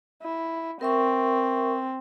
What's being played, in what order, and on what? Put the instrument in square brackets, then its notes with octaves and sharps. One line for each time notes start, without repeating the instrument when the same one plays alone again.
[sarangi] E4
[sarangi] C4 [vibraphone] A#4 E5 C#6